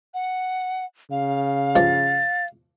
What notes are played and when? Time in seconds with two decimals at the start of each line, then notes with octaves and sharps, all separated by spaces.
0.14 F#5
1.11 C#3 F5
1.76 G2 F3 A6